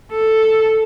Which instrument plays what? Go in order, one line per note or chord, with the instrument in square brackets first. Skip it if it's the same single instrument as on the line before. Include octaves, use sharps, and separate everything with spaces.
[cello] A4